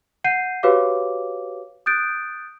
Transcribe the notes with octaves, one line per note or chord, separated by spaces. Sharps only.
F#5 G6 C7 D#7
F#4 G4 B4 C#5 F5 D6
D#6 F#6 G6 A6 D7